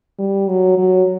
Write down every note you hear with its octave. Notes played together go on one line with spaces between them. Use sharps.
G3
F#3
F#3